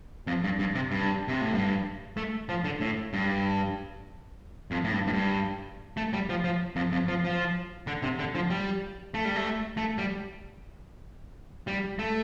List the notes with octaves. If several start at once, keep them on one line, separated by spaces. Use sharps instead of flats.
F2
G2
G2
C3
G2
C3
A2
G2
A3
F3
D3
A2
G2
F2
A2
G2
A2
G2
A3
G3
F3
F3
F2
F2
F3
F3
D3
C3
D3
F3
G3
A3
G3
A3
A3
G3
G3
A3